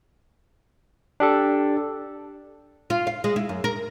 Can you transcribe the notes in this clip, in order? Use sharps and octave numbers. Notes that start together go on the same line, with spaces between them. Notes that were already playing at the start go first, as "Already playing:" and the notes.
D4 G4 A4
F4
F5
G#3
E4
F#2
A#4